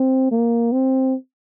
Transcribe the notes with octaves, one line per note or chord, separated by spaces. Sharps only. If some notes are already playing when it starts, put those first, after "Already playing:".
Already playing: C4
A#3
C4